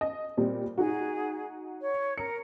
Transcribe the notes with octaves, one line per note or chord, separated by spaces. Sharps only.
D#5
A#2 G3 C4
D#4 F#4 G#4
C#5
A#4 C#7